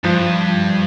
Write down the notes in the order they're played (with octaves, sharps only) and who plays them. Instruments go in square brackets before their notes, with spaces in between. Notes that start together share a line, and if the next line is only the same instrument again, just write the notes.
[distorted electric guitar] G2 [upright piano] F3